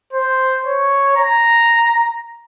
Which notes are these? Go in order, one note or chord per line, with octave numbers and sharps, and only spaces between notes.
C5
C#5
A#5